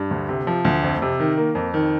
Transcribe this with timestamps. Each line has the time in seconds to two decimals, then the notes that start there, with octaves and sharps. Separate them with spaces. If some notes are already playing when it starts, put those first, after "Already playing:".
Already playing: G2
0.11 D2
0.29 C3
0.47 F3
0.65 D2
0.83 F2
1.02 C3
1.20 D#3
1.37 A#3
1.55 F2
1.74 D#3